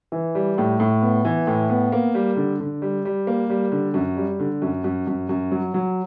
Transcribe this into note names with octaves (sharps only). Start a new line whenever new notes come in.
E3
G3
A2
A2
B3
E3
A2
B3
A#3
G3
D3
D3
G3
G3
A#3
G3
D3
F#2
G3
D3
F#2
F#2
F#2
F#2
F#3
F#3